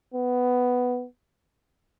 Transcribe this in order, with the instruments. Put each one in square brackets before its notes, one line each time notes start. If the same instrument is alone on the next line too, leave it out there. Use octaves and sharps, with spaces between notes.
[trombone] B3